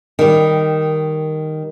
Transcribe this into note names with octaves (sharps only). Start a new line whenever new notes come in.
D#3 G3